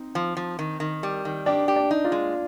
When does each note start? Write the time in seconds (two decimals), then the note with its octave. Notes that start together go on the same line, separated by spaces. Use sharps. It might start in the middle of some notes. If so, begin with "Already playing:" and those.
Already playing: C4 D#4
0.15 F3
0.37 F3
0.59 D#3
0.80 D#3
1.03 G3
1.25 D#3
1.46 D4 G4
1.68 G4
1.76 D4
1.91 D#4
2.05 D4 F4
2.12 G#3